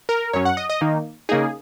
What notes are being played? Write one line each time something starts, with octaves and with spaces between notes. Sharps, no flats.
A#4
F#2 F#3 C#4 C#5
F#5
D#5
D#5
D#3 A#3 D#4
C#3 A#3 D#4 G#4